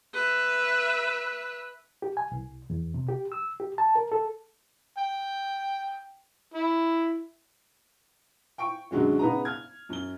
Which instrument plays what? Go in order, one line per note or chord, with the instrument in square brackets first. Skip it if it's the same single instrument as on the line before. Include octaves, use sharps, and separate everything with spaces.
[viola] B4 E5
[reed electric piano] G4
G#5
C2
E2
C3
G4
E6
G4
A5
A#4
A4
[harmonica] G5
E4
[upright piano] G5 C#6 D7
F#2 D3 F#3 G#3 C#4
C#3 B3 D#4 A#5
F6 G#6
F#2 G7